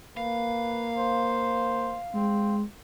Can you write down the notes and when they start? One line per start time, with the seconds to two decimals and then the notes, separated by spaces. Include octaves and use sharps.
0.17 A#3 B4 F5
0.97 C5
2.14 G#3 C4